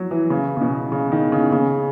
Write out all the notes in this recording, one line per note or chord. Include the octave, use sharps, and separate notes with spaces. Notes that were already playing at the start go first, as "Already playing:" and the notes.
Already playing: F#3
E3
C#3
C#3
B2
C#3
D#3
C#3
C#3